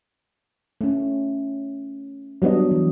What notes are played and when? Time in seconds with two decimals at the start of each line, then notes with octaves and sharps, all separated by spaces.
0.81 A3 C#4
2.42 F#3 G3 B3 D4 D#5
2.71 E3